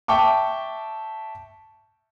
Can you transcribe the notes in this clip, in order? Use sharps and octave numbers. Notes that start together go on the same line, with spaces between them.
E5 G5 A5 C#6 D6